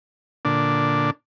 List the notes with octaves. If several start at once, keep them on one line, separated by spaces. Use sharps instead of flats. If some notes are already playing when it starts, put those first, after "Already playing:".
A#2 D3 D4